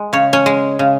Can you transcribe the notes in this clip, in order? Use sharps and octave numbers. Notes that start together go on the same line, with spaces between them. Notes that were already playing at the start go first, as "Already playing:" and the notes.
Already playing: G#3
C#3 C#5
C#4 C#5
G#3
C#3